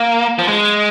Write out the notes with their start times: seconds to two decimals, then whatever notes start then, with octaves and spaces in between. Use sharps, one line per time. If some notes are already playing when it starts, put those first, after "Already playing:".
Already playing: A#3
0.39 F3
0.48 G#3